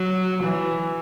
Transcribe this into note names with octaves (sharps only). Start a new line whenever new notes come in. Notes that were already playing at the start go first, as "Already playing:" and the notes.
Already playing: F#3
E3